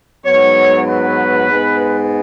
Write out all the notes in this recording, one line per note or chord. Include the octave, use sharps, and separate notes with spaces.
G#2 F#3 B3 C#5
B4
G#2 G#3 B3